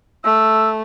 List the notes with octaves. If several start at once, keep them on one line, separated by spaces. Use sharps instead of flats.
A3 E6